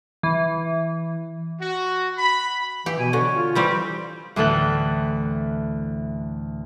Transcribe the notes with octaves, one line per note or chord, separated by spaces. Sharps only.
E3
F#4
B5
E3 G4
B2 G#5
D3 C#5
F4
E3 G3 C4 G4
D2 A2 E3 A4 F#6